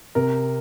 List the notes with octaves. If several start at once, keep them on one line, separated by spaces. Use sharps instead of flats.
C3 A#4